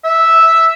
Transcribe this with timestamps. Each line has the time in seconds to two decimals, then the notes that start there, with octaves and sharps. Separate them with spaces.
0.04 E5